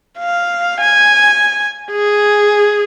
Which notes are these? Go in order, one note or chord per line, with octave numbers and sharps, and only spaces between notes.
F5
G#5
G#4